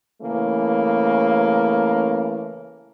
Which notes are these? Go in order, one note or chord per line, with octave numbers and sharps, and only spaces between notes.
C#3 E3 A3 A#3